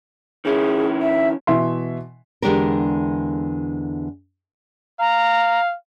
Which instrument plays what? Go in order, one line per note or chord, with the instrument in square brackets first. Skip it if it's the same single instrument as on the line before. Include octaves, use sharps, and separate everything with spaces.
[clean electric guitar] D#3 C#4 E4 [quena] G#4
[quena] E5
[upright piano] B2 E3 E5 C6
[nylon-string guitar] E2 D3 G#3 D4 G4 A#4
[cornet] F5 [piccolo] A#5